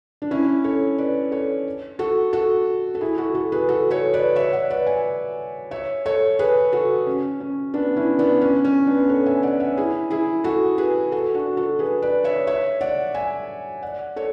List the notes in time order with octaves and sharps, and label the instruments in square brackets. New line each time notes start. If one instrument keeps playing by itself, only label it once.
[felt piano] D4
C#4 E4
A4 C#5
B4 D5
A4 C#5
F#4 A4
F#4 A4
A4
E4 G#4
F#4 A4
F#4 A4
G#4 B4
F#4 A4
A4 C#5
B4 D5
C#5 E5
D5 F#5
B4 D5
E5 G#5
C#5 E5
A4 C#5
G#4 B4
F#4 A4
C#4
C#4
B3 D4
C#4 E4
B3 D4
C#4
C#4
B3 D4
A4 C#5
E5 G#5
D5 F#5
C#5 E5
E4 G#4
E4 G#4
F#4 A4
G#4 B4
F#4 A4
D4 F#4
F#4 A4
G#4 B4
B4 D5
C#5 E5
C#5 E5
D5 F#5
E5 G#5
D5 F#5
A4 C#5